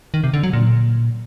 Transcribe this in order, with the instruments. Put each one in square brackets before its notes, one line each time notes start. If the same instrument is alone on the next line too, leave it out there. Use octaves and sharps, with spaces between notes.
[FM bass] D#3
C3
D3
F#3
A#2